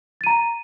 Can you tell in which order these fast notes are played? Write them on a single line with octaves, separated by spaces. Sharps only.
A6 D#7 A#5